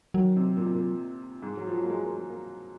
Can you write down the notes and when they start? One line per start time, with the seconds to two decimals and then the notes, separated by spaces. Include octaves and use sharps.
0.14 D#3 F#3
0.36 C3
0.57 A#2
0.66 C3
0.74 A#2
1.42 G#2
1.57 F#3
1.67 F3
1.74 F#3
1.84 A#3
1.90 G#3
2.05 A#3
2.18 G#3
2.29 A#3